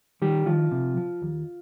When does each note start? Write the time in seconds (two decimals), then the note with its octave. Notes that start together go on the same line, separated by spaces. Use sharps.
0.22 D#3 G3 G4
0.46 D#3 F3 F4
0.72 C3
0.97 F3
1.22 D#2